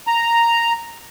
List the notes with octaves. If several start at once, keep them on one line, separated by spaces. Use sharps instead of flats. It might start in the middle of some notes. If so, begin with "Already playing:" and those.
A#5